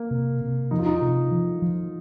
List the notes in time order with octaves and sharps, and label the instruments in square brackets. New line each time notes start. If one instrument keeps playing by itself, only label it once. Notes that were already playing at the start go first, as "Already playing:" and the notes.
Already playing: [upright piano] A#3
[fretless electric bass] C3
C3
[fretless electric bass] F3 [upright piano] D#4
[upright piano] F4
D#4
[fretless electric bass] C3
F3
F3